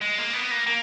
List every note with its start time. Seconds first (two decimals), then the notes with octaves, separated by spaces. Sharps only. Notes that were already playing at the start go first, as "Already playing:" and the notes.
0.01 G#3
0.18 A#3
0.34 B3
0.51 A#3
0.67 A#3